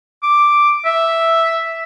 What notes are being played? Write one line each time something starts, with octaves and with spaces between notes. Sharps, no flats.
D6
E5